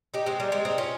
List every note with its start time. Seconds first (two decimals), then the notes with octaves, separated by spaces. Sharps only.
0.14 D#4 G4
0.26 G#3 C4
0.40 G3 A#3
0.52 G#3 C4
0.65 C4 D#4
0.78 C#4 F4